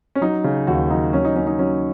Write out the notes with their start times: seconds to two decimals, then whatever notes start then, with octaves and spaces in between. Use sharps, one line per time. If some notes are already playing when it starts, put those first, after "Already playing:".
0.15 C#4
0.21 F#3 D#4
0.44 C#3
0.67 D#2 F#4
0.90 F#3 D#4
1.13 F#3 C#4
1.25 D#4
1.36 F#3 C#4
1.47 D#4
1.58 F#3 C#4